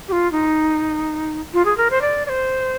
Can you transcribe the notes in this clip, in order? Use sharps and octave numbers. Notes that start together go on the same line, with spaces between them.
G4
F4
D#4
F4
G#4
A#4
C5
D5
D5
C5